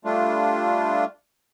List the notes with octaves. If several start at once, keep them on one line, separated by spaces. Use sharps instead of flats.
G3 A3 D4 F4